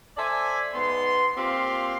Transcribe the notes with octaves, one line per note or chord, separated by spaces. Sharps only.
A4 C5 D5 E5 G#5
G#2 B3 C6
A#2 C4 F4 G4 F5 C6